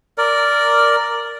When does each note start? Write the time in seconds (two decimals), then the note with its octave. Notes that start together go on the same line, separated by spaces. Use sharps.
0.18 A#4 D5